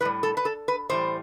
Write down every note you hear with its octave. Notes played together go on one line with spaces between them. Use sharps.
A2 G3 B4
A4
B4
A4
B4
A2 E3 G3 C5